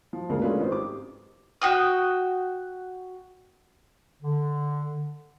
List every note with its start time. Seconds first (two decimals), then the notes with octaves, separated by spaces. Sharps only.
0.13 F3
0.30 D2 C#3 G#3 A#3 A#4
0.42 G#3 A3 C#4 D4 F4 B4
0.60 G#1 C5
0.72 G4 D6
1.62 F#4 G5 D#6
4.22 D3